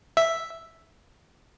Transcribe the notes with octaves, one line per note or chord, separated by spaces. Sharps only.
E5